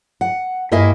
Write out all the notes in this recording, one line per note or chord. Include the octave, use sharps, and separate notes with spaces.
F#5
G2 A#3 E4 D#5 E5 G#5